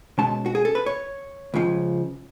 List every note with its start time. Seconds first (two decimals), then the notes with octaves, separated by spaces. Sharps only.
0.18 B2 G#3 C#4 A5
0.46 F#4
0.55 G#4
0.65 A4
0.75 B4
0.86 C#5
1.54 C#2 C#3 F3